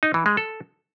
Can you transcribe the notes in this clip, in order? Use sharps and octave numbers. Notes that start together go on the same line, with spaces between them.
D#4
E3
G#3
A4